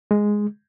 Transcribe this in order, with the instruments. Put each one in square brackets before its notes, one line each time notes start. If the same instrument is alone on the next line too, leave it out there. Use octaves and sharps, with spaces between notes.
[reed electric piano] G#3